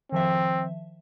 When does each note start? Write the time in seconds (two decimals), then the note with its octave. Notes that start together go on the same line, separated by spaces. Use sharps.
0.12 D#3 F3 C4 E5